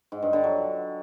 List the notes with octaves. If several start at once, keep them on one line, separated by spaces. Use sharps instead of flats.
G#2
G2
D3
F#3